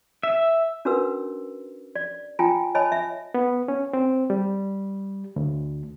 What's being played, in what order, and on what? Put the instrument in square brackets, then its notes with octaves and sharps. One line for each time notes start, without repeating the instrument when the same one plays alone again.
[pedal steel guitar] E5
[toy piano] C#4 D4 F#4 A#4 B4 E6
D5
F4 G5 G#5 A#5
C#5 D#5 G#5 A5 B5
E5
[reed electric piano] B3
C#4
C4
G3
D2